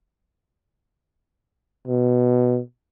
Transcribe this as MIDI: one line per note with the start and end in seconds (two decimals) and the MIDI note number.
1.88 2.59 47